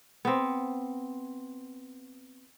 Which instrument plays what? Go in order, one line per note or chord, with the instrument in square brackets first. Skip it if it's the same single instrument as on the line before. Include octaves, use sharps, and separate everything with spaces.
[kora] B3 C4